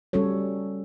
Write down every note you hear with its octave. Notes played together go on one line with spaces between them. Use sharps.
G3 C#4 F#4 A4 C#5